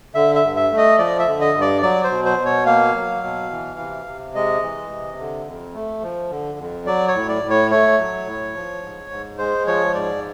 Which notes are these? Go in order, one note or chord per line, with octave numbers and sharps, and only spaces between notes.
D3 E5
E5
G2
E5
A3
D#5
F3 D5
E5
D3
D#5
G2
D5
F#3 D5
C5
B2
C5
B2
C#5
A#3 F5
F#3
B2
E3
C3
C3
G#3 D#5
E3
C3
D3
F2
A3
F3
D3
F2
F#3 D5
C#5
A2
D5
A2
C#5
A3 C#5
F#3
A2
F3
G#2
G#2
G#3 C5
F3 C#5
G#2 D5